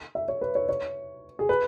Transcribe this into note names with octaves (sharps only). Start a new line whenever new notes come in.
E5
C#5
B4
C#5
C#5
G#4
B4